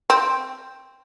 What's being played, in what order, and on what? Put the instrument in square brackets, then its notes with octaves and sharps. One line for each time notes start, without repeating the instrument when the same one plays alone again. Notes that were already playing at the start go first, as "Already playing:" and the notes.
[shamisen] C4